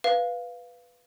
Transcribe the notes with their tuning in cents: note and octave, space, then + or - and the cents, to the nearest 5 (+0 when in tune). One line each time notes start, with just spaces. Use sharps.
B4 +0 F5 +0